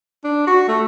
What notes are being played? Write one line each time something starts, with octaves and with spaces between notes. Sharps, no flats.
D4
F#4
A3